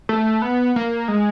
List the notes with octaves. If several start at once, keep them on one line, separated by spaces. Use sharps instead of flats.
A3
B3
A#3
G#3